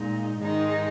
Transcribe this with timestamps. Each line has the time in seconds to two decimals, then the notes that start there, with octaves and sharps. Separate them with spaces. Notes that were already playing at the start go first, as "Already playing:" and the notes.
Already playing: A#2 G#3 D#4
0.38 G#2 D#3 G#3 D#4